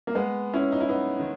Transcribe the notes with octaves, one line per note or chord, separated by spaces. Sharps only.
A#3
G#3 B3
C#4 E4
D#4
E4
B3 D#4
D#3